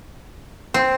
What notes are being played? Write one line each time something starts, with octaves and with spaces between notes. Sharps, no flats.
C4